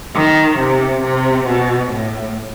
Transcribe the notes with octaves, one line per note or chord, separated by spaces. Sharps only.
D#3
C3
C3
B2
A2